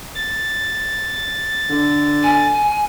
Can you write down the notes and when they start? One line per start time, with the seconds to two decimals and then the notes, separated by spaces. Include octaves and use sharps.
0.15 A6
1.69 D3
2.23 G#5